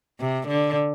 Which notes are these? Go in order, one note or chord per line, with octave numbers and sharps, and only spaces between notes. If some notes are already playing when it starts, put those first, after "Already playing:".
C3
D3